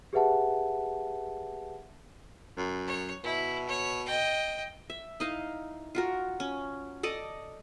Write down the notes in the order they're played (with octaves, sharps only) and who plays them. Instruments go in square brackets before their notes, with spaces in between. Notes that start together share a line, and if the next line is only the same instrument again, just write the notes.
[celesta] G4 G#4 B4 E5 F#5 A5
[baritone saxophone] F#2
[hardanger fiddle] C#5
[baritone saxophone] B2 [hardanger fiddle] E4
[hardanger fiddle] C#5
D#5 G5
[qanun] E5
D#4 E4 D#5 F5
F4 F#4 A#4
C#4
A4 D5 D#5